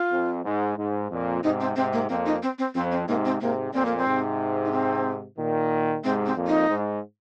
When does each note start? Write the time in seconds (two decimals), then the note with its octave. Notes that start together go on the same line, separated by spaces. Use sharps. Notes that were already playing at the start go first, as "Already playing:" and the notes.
Already playing: F4
0.11 F2
0.44 G#2
0.77 G#2
1.10 F2 A#2
1.43 G#2 C3 D#4
1.60 C4
1.76 G#2 C3 C4
1.93 A#3
2.09 F2 A#2 C4
2.26 D#4
2.43 C4
2.58 C4
2.74 F2 C4
2.91 C4
3.07 G#2 C3 A#3
3.25 C4
3.41 G#2 C3 A#3
3.73 F2 A#2 C4
3.85 A#3
3.97 C4
4.06 G#2 C3
4.65 D#4
4.72 C4
5.37 A#2 D#3
6.03 G#2 C3 C4
6.26 C4
6.36 F2 A#2
6.47 D#4
6.70 G#2